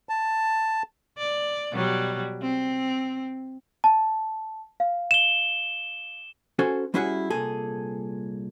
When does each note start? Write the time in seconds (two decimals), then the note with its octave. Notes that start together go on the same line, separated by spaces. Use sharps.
0.09 A5
1.18 D5
1.72 B2 F#3 G3
2.42 C4
3.84 A5
4.80 F5
5.11 E7 G7
6.59 C#4 F#4 A4 C5 G#5
6.94 G3 C#4 E4 F#4 G#4 F#5
7.30 C2 A#2 G#4 A4